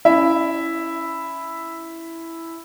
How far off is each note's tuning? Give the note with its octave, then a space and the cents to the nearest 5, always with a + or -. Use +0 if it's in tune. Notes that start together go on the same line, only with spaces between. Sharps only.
C#4 +10 E4 +0 E5 +0